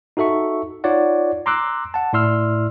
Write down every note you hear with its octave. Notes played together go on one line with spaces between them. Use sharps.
D#4 F#4 A4 E5 C#6
D#4 F4 C#5 D5 F#5
A#5 C6 D6 E6 F#6
F#5 A5
A2 E4 D5 C6 E6 F6